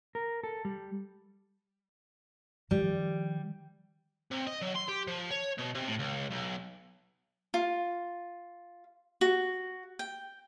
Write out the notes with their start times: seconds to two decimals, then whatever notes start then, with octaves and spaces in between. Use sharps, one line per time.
0.15 A#4
0.43 A4
0.65 G3
2.71 D#3 F3 G3
4.31 C3
4.47 D#5
4.61 F#3
4.75 C6
4.88 G4
5.08 F3
5.31 C#5
5.58 B2
5.75 C3
5.88 A2
5.99 C#2
6.30 B1
7.54 F4
9.21 F#4
9.99 G5